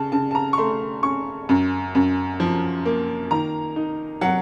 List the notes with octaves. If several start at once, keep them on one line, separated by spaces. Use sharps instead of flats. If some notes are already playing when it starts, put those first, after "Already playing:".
Already playing: C#3 A5
C#3 A5
A5
A#5
C#6
A3 C6
C#4 C#6
F#2
F#2
F3
A#3
D#3 A#5
D#4
F#3 F#5